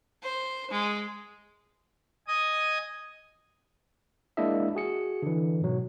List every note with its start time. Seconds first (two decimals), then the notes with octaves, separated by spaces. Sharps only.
0.23 C5
0.71 G#3
2.28 D#5 G#5 D#6
4.37 G#3 A#3 D4 E4 D#5 E5
4.75 F#4 G#4 C#7
5.22 D3 E3
5.61 G#2 B2 F#3